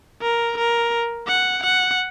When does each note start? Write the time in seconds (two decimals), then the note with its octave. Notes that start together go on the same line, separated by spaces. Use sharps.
0.22 A#4
0.58 A#4
1.28 F#5
1.64 F#5